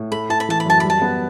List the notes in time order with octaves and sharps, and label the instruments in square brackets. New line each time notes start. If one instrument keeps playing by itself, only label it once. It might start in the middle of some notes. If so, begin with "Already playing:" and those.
Already playing: [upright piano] A2
[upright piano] A3 [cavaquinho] B5
[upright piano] E4 [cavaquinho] A5
[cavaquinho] B5
[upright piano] E3 [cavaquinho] A5
[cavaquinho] B5
[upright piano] F#2 [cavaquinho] A5
[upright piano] G3 [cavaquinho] B5
[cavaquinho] A5
[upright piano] B3